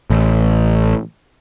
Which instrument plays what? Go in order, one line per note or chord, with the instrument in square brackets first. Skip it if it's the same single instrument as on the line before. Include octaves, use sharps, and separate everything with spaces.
[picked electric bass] A1